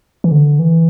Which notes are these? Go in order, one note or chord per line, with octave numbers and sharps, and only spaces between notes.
E3
D3
E3